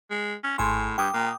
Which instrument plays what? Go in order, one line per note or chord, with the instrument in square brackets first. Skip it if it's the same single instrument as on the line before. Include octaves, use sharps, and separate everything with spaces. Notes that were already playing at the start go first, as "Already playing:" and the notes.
[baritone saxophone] G#3
C#4
[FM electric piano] G#1 G#5 C6 [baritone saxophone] A2
[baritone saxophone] G2 [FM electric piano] G5 D6 D#6
[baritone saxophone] A#2